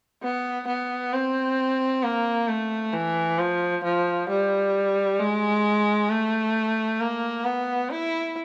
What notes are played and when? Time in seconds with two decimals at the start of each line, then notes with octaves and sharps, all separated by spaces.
0.22 B3
0.67 B3
1.13 C4
2.03 A#3
2.48 A3
2.93 E3
3.38 F3
3.84 F3
4.29 G3
5.19 G#3
6.10 A3
7.00 A#3
7.45 B3
7.90 E4